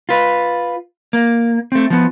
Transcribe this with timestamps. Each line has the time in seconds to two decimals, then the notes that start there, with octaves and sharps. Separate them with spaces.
0.09 F4 B4
1.13 A#3
1.72 A3 C4
1.90 F3 B3